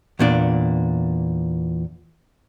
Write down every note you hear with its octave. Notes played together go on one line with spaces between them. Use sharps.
E2 A#2 D4